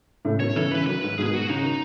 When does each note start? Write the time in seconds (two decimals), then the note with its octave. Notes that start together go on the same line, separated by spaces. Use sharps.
0.25 A2 C#3
0.40 B2 D#3 C#5
0.56 C#3 E3 A4
0.71 C#3 E3 B4
0.87 D#3 F#3 B4
1.03 G#2
1.18 G#2 B2 G#4
1.28 B2 D#3
1.34 F#4
1.50 C#3 D#4
1.62 D#3